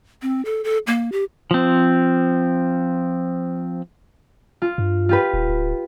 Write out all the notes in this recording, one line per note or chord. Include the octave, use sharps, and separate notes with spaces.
C4
A4
A4
A#3
G4
F3 C4
F4
G2
F4 G4 B4
D#1
D1